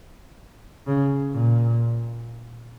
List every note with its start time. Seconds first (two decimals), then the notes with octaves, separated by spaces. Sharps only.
0.87 C#3
1.33 A#2